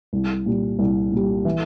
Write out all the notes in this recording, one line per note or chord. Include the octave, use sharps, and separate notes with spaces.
C2
A#2 G3
C2
A#2 G3
E3